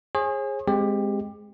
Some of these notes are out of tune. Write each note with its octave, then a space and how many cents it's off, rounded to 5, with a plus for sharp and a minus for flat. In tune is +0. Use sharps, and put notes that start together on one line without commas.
G#4 -10 C#5 -45
G#3 +0 C4 +0 G4 +15